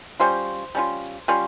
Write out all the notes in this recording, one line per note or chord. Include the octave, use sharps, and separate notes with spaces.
G3 C#4 F4 C5
G3 C#4 F4
G3 C#4 F4